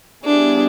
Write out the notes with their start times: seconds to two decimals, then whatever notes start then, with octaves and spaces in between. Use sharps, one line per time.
0.25 G3 B3 D4 E4 G#4